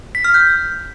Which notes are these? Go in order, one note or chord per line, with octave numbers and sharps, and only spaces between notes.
B6
F6
G6